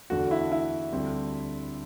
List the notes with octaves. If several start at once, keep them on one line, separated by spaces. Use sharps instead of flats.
E2 D3 A3 F#4
E4
E4
D2 D3 G3 C4